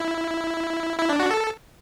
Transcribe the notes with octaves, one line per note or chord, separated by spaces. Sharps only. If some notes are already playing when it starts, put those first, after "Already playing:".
Already playing: E4
E4
D4
F#4
A4